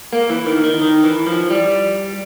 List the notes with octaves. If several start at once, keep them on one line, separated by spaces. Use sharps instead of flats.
A#3
E3
D#3
D#3
D#3
E3
F3
G3